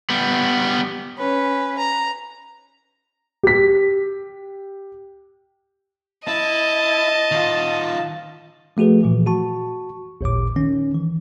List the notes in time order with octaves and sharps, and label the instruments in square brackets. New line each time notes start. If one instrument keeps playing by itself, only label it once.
[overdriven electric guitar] G3 B3
[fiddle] C#4 B4
A#5
[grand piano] G4 B6
[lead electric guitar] E4 [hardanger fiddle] D#5 [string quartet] A5
[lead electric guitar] D#3 F4
[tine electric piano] F3 A3 F#4 G#4 B4
A#2 E3 F3
F#4 A5 C#6
A1 D#2 A#2 D6
D#3 C#4
E3